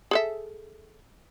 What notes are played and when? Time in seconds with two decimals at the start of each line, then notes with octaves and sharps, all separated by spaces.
0.11 G#4 A4 E5